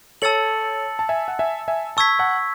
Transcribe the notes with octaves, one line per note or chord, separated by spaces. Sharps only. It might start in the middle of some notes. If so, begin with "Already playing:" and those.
A4 C#5 A5 E6 A6 C#7 F#7
A5
E5 G#5
F#5
E5 G#5
E5 G#5
A5 C#6 E6 G#6 B6
F#5 A5